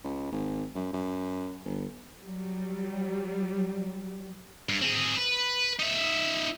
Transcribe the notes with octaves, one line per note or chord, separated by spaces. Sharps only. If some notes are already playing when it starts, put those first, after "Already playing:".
C#2
G#1
F#2
F#2
G1
F#3 G3
G2
C4 G#4
B4
D#4 E5